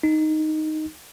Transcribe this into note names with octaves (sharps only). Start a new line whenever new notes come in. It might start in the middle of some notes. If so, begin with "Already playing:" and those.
D#4